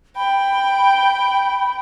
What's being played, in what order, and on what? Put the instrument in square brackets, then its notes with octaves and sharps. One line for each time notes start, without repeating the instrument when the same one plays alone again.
[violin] G5 [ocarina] B5